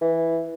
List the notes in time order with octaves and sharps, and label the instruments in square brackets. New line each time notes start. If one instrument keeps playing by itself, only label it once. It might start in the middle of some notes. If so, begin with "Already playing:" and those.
[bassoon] E3